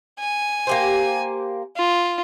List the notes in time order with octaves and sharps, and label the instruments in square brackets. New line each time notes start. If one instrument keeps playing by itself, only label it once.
[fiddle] G#5
[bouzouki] A#3 G4 C5
[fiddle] F4